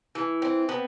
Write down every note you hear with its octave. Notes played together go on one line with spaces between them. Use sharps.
E3
C4
B3